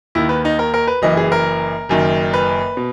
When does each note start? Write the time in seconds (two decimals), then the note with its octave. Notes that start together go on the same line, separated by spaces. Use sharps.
0.15 D#2 D#3 E4
0.29 B4
0.45 D#4
0.59 A#4
0.74 A#4
0.87 B4
1.02 F#1 F#2 E3 D#5
1.17 G#4
1.32 A#4
1.89 F#1 F#2 D#3
2.34 B4
2.77 B2